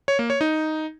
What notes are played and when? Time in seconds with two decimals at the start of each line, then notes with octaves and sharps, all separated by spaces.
0.08 C#5
0.19 A#3
0.30 C#5
0.41 D#4